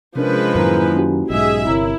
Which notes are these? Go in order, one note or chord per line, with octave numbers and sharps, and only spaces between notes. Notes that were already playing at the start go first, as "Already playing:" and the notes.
C3 F3 G#3 C#4 D4 A#4 B4
F#2 A2 D#3 A#3 E4 A#4 G#5 A#5
C#4 F#4 G4
B1 G#2 G#4 D#5 E5 G#5
G1 C3 E4 A#4 C#5 A#5